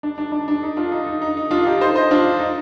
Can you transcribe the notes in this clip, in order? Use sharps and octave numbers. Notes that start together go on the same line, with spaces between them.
D4
D4
D4
D4
D#4
D4 F4
D#4
D#4
D#4
D#4
D4 F4
D#4 G4
C5 D#5
C5 D#5
D4 F4
D#4